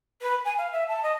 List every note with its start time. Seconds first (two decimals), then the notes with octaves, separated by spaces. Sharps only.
0.22 B4
0.45 G#5
0.58 F5
0.72 E5
0.88 A5
1.03 D#5